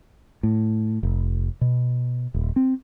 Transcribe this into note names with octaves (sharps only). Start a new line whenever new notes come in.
A2
F1
B2
D#1
C4